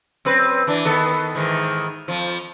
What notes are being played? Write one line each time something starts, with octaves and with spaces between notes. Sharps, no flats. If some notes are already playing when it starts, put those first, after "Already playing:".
F#2 C4 B4
E3 D4
D#3 B3 A4
G#2 D#3 E3
F2 F3